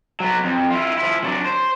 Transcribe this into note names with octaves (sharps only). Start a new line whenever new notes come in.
F#3 B3
F2
E4 F4
F3 E4
F#3 D4
C5